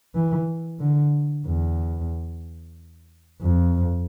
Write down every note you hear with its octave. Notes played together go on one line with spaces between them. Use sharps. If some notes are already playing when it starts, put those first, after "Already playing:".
E3
D3
E2
F2